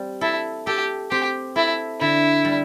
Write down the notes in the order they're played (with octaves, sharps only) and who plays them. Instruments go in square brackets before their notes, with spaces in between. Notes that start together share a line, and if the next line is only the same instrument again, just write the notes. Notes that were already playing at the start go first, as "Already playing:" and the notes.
Already playing: [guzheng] G3 C4
[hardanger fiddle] E4 [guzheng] A4
[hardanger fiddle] G4 [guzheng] A4
[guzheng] C4 [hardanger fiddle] G4
[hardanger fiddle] E4 [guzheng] A4
[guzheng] D3 [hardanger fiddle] E4
[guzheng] G3